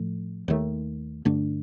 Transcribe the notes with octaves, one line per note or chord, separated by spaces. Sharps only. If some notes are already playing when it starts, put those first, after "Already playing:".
Already playing: A2 F3 A3
D#2 D#3 A3
G2 D3 A3 D4